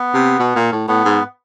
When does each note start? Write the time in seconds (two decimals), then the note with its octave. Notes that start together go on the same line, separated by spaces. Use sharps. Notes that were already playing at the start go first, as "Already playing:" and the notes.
Already playing: B3
0.14 C3
0.39 B2
0.55 A#2
0.72 A2
0.88 A2 B3
1.05 G#2